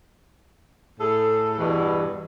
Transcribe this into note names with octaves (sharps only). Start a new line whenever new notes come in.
A2 G#4 A4
E2 G2 B2 E3